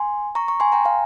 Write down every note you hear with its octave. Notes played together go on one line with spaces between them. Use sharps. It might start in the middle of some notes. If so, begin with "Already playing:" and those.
Already playing: G#5 C6
A#5 C#6
A#5 C#6
G#5 C6
G5 A#5
F5 G#5